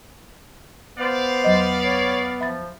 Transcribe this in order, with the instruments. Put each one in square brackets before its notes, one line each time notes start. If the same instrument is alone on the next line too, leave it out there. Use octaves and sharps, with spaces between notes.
[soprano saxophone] B3 [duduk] C5 [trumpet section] D5 F5
[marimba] E2 F#3 D#5
[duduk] C#5
[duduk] F3 [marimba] E5 B5 A6